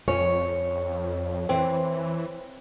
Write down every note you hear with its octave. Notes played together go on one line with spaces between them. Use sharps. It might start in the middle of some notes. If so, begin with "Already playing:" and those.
F2 C#4 C#5
E3 C4